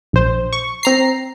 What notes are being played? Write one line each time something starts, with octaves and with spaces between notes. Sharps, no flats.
A#1 C5
C#6
C4 A#5 C7